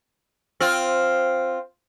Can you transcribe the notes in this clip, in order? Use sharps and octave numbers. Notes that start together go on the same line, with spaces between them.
C4 F4